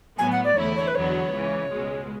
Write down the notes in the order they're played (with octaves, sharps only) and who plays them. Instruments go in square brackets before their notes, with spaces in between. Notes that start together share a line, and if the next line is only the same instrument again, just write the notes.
[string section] A2 F#3 B3 [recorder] G#5
[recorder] F#5
D5
[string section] E2 D3 A3 E4 [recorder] C#5
[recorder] C#5
B4
[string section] E2 D3 F#3 B3 [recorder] C#5
[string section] C#2 C#3 E3
C#2 B2 G#3